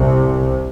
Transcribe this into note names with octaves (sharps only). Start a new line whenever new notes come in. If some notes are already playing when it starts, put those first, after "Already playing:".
Already playing: C2 C3